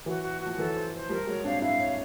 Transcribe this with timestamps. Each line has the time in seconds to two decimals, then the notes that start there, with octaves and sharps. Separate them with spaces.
0.06 E3 F#3 F#4
0.23 F#4
0.41 F#4
0.46 F3
0.58 E3 F#3 A4
0.75 C5
0.93 C5
1.09 F3 G3 A#4
1.27 F#3 G#3 C#5
1.44 C4 D4 F5
1.62 D4 E4 F5
1.79 C#5